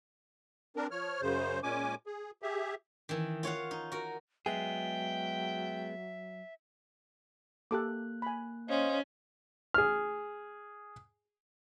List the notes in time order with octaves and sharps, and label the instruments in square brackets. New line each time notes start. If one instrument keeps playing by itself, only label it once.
[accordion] C4 D4 A#4
F3 C#5 F6
F#2 C#3 C5
A#2 G#3 C#4 G#5 D6
G#4
G4 G#4 E5
[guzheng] D#3 E3
F4 C#5 F5 F#5
D#4
F#4 A#4
[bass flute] F#3 [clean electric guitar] G#3 B3 G#4 [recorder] E5 [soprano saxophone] G5
[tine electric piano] A#3 F#6 [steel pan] G4 A4 D6
[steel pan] G#5 B5
[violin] C#4 [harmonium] C5 D#5 F5
[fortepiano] G#4 F6